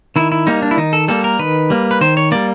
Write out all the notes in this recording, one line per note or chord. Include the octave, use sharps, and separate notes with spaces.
D#3 E4
E4
G3 A#3 D#4
D4
E4
D#3 D#4
A4
G3 A#3 A4
A#4
D#3 B4
G3 A#3
B4
D#3 C5
C#5
G3 A#3 D5